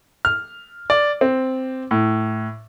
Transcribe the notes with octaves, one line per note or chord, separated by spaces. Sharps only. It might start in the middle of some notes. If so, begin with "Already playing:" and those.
F6
D5
C4
A2